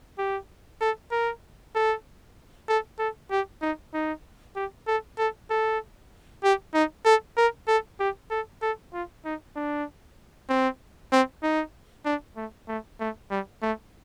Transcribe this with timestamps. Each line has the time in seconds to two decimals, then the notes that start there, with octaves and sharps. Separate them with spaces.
0.18 G4
0.81 A4
1.12 A#4
1.75 A4
2.69 A4
2.99 A4
3.31 G4
3.62 D#4
3.94 D#4
4.56 G4
4.87 A4
5.18 A4
5.50 A4
6.44 G4
6.74 D#4
7.05 A4
7.37 A#4
7.68 A4
8.00 G4
8.31 A4
8.62 A4
8.93 F4
9.25 D#4
9.56 D4
10.49 C4
11.12 C4
11.43 D#4
12.05 D4
12.36 A3
12.68 A3
13.00 A3
13.31 G3
13.62 A3